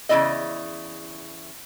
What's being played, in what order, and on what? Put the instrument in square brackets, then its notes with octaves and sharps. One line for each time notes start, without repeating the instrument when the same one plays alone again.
[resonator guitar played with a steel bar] E2 C#3 B3 E4 D5 D#5